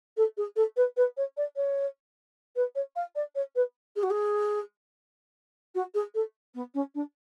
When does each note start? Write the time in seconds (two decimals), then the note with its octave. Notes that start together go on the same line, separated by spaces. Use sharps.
0.17 A4
0.37 G#4
0.56 A4
0.76 B4
0.97 B4
1.17 C#5
1.37 D5
1.56 C#5
2.56 B4
2.75 C#5
2.95 F5
3.15 D5
3.35 C#5
3.55 B4
3.96 G#4
4.03 F#4
4.10 G#4
5.75 F#4
5.94 G#4
6.14 A4
6.54 B3
6.74 C#4
6.94 D4